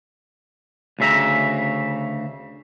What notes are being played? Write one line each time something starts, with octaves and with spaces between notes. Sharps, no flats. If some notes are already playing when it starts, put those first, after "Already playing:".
D2 C#3 E5 A#5